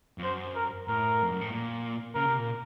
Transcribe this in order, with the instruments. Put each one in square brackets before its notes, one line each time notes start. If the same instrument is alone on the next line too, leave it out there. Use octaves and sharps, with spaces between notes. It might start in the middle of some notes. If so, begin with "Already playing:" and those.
[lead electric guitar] F2
[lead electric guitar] F#2 [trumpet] C5
[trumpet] A#4
[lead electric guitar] A2 [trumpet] A#4
[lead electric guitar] F2
F#2
A2
A#2
[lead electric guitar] C#3 [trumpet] A#4
[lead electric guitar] C3
A#2